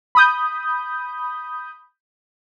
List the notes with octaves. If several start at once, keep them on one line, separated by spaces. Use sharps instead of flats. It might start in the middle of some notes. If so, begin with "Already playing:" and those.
B5 D#6 G6